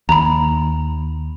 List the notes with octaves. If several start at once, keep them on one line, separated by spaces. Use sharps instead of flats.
D#2 A#5 B5